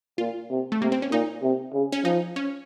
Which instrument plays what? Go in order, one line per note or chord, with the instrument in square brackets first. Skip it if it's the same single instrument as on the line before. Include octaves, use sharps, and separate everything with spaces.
[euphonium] A#2 [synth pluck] F4
[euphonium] C3
[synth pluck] A3
[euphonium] C3 [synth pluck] A#3
[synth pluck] C4
C#4
[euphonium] A#2 [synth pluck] D#4
[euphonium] C3
C#3
[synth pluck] C#4
[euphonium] F3 [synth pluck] D#4
[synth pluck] C#4